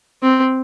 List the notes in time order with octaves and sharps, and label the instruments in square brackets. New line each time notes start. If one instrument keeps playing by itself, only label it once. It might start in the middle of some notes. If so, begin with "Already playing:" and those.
[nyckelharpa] C4